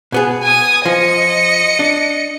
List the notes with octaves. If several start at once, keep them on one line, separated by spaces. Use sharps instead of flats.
B2 B3 G#4
G#5 D#6
F3 D#5 C#7
D4